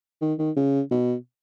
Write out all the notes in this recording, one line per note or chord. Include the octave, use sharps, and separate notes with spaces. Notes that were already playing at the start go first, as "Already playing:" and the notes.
D#3
D#3
C#3
B2